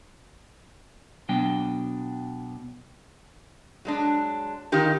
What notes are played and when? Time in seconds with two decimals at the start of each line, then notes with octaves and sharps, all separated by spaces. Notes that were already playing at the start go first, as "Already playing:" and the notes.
1.29 B2 F#3 D4 G5
3.85 F#3 G#3 D4
4.72 D#3 D#4 F4 G4 A#4